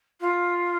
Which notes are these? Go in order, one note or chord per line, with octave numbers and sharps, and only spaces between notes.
F4